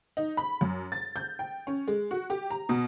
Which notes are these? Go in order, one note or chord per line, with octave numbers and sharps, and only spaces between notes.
D#4
B5
F#2
A6
G6
G5
C#4
G#3
F#4
G4
A#5
B2